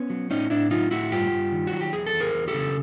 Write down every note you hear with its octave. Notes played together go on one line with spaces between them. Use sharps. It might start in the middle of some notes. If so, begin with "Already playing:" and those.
Already playing: B3 C#4
F#3
A2 C#4 D#4
A2 D4 E4
F#3 D#4 F4
A2 E4 F#4
G2 F4 G4
G2
D#3
F#4
F#3
G4
E2 G#4
A4
E2
G#4 A#4
E2
G4 A4
C#3